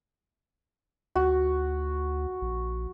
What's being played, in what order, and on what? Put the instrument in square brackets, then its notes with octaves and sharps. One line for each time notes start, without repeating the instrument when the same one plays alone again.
[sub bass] D2 [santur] F#4
[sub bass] A#1